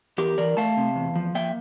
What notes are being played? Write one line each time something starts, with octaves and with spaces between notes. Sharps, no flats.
E2 G4 A#4
E3 A#4 D5
A3 F5 A5
C3
E2
F3
A#3 E5 G5